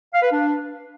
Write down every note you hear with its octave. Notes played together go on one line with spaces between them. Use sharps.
F5
B4
D4